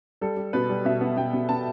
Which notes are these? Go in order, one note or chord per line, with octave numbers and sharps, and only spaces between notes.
G3 A4
G3
B2 B4
G3
B2 E5
B3
B2 G5
B2
B3 A5